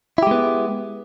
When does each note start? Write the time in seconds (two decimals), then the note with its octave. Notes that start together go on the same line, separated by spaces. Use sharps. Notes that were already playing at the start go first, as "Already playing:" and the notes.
0.18 E4
0.23 G4
0.27 G#3
0.31 B3